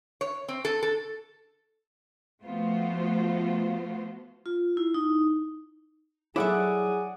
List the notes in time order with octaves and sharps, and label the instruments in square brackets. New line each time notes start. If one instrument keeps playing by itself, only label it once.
[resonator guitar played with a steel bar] C#5
C4
A4
A4
[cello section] F3 A3 B3 F4 F#4 C5
[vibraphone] F4
E4
D#4
[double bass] F#3 [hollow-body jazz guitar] E4 A4 E5 [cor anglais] G#4 [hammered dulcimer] D5 F#5